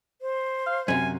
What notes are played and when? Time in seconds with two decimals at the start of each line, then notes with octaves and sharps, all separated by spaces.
0.22 C5
0.66 F5
0.88 F#2 C3 G#5